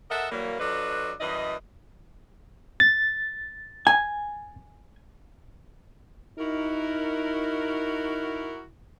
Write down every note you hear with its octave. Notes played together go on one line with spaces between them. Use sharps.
A4 A#4 D#5 E5 F#5
E3 F#3 G3 A#3
F#3 D4 F4 A4 B4 D#5
F#2 E3 G3 D5 D#5
A6
G#5
D#4 E4 F#4 A#4